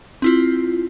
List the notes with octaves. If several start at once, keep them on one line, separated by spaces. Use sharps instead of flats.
C4 E4 F4